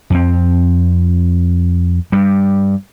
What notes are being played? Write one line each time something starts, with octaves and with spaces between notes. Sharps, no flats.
F2 C4
G2 G3